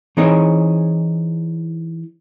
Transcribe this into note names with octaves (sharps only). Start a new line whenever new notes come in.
E3 C4 D#4 G#4 C#5